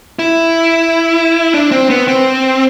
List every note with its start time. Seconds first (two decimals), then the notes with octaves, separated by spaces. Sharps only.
0.19 E4
1.54 D4
1.71 C4
1.90 B3
2.08 C4